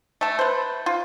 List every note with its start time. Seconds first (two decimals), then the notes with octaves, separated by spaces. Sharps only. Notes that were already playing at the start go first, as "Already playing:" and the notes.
0.21 A3 A5
0.39 B4 C5
0.86 F4